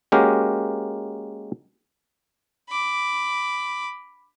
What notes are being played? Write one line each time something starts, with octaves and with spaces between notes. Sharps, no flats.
G#3 A#3 C#4 F#4 G4 A#4
B5 D6